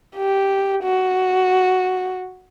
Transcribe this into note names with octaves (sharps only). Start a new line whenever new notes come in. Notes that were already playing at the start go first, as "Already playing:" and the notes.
G4
F#4